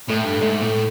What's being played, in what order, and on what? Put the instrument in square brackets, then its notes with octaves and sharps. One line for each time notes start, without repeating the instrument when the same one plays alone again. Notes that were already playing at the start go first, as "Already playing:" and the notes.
[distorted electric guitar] A2 [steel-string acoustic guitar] A3
[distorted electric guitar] G2
[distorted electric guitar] G#2 [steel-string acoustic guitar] A3
[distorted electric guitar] A2